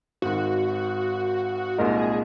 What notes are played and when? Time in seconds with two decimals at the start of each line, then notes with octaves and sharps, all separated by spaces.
0.22 G#1 G#2 D#3 F#4
1.78 C2 A#2 G#3 D#4 A#4
1.98 G#4